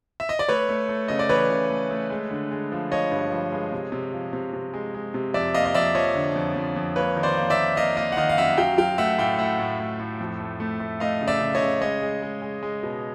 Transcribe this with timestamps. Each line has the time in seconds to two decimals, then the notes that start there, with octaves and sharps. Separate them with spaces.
0.20 E5
0.29 D#5
0.39 D5
0.49 A3 B4 C#5
0.69 A3
0.89 A3
1.08 C#3 D#5
1.19 D5
1.29 E3 B4 C#5
1.50 C#3
1.70 A3
1.90 A3
2.10 G#3
2.31 D3
2.51 G#3
2.72 F3
2.91 F3 C#5 D#5
3.11 G2
3.32 F3
3.52 G#3
3.72 C3
3.92 C3
4.12 F3
4.33 C3
4.53 C3
4.74 G#3
4.94 G#3
5.14 C3
5.34 F2 D5 E5
5.54 A#3 D#5 F5
5.65 D#5
5.74 F2 D5 E5
5.94 F3 C#5 D#5
6.15 D3
6.36 F2
6.56 F2
6.76 F2
6.96 A#3 B4 C#5
7.16 D#3
7.23 C5 D5
7.37 A#3
7.50 D5 E5
7.57 A#3
7.76 A#3 D#5 F5
7.97 A#3 D#5 F5
8.12 F#5
8.17 D#3 D#5 F5
8.29 F5
8.37 F#2 E5 F#5
8.58 F#3 F5 G5
8.78 F#3 F5 G5
8.98 A3 E5 F#5
9.18 A2 F5 G5
9.39 A2 E5 F#5
9.59 A2
9.80 A2
10.00 A2
10.20 F2
10.40 A3
10.60 A3
10.80 A3
11.00 A3 D#5 F5
11.21 C#3
11.28 D5 E5
11.41 C#3
11.55 C#5 D#5
11.61 C#3
11.81 G#3 C#5 D#5
12.02 G#3
12.22 G#3
12.42 G#3
12.63 G#3
12.83 B2